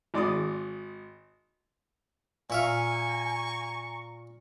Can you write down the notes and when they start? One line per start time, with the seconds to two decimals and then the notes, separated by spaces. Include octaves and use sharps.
0.14 G#1 D5 C6 D#6
2.50 A#2 E5 F5 G#5 A#5 C#6